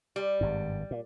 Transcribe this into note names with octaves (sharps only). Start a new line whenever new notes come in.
G3
G#1 G2
A#2